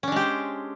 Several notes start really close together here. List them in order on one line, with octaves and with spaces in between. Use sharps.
C#4 D4 G#3 G4 C5